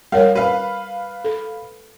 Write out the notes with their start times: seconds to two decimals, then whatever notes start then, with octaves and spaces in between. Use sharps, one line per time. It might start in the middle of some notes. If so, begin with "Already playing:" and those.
0.12 G3 A#4 C#5 F5
0.35 B4 F5
1.24 A4